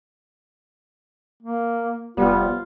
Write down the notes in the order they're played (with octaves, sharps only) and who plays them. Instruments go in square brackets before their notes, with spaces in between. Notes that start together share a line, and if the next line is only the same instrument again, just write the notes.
[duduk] A#3
[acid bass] F1 [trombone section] G3 B3 [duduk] F4